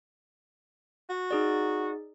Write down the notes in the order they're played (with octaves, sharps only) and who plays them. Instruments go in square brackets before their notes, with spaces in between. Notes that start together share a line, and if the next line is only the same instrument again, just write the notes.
[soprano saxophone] F#4
[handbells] D#4 G#4 D5